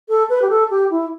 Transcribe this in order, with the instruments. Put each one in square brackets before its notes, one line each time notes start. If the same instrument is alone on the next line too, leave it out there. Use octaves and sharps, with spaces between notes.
[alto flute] A4
B4
G4
A4
G4
E4